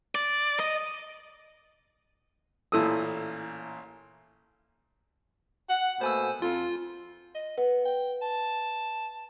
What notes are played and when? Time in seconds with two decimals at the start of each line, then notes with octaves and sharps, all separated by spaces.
0.15 D5
0.60 D#5
2.72 A1 A#2 E4 A4 D#6 E6
5.70 F#5
6.01 B2 A3 A#3 C5 G#5 E6
6.42 F2 F4 A4 F5
7.35 D#5
7.58 B3 B4
7.85 G5
8.22 A5